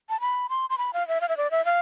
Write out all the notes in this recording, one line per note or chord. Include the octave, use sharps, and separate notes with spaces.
A5
B5
C6
C6
B5
F5
E5
F5
E5
D5
E5
F5